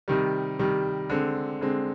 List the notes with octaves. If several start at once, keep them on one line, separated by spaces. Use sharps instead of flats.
C3 D#3 G3
C3 D#3 G3
D3 G#3 C4
D3 G#3 C4